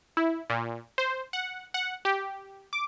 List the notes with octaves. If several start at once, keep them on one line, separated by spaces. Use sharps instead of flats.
E4
A#2
C5
F#5
F#5
G4
D6